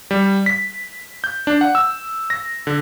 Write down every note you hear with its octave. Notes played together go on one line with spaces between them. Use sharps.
G3
B6
G6
D4
F#5
E6
A#6
D3